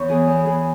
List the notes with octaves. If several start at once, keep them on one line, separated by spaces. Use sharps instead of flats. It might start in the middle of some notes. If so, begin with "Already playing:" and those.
Already playing: E2 C#5
E3 B3 G#4
E2
E3 B3 G#4